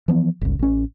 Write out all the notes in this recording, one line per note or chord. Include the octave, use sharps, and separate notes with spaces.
E3 F3 B3
G1 C#2
A1 C#4